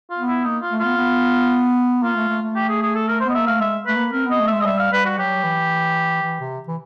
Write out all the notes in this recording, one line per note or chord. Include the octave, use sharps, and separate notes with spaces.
F4
B3
E4
A#3 D#4
F4
A3
B3 F4
B3
A#3 F4
A3
A3
A3
G4
G#4
G#4
A4
A#4
C5
B3 D#5
A#3 E5
A3 F5
G#3 E5
A3 B4
A#3
C4 A#4
B3 D#5
A3
E5
G#3
D#5
G3 E5
F5
G3 B4
F#4
F#3 G4
E3
E3
C3
E3